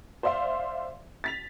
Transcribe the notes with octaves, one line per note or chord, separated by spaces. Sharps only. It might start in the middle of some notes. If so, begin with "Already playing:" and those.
C5 D5 E5 F5 C6
A6 B6 F7